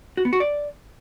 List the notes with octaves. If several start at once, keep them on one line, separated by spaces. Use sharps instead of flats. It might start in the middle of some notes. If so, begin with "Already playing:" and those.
F#4
B3
F#4
D5